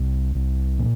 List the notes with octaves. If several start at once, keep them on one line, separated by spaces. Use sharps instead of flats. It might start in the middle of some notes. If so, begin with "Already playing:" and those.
Already playing: C2
C2
A#2